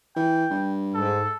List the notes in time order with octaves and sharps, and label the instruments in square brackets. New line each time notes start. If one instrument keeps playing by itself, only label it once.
[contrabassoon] E3 [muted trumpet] G5
[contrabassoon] G2
[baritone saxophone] G#2 [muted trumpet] A4